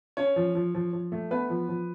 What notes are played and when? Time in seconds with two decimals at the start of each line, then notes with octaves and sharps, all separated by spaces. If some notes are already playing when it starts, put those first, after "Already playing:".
0.17 C#4 C#5
0.36 F3
0.55 F3
0.74 F3
0.93 F3
1.12 A3
1.31 B3 B4
1.50 F3
1.69 F3